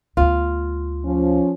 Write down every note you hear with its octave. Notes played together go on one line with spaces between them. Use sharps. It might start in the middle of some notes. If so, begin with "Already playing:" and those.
D2 B3 F4
F3 C#4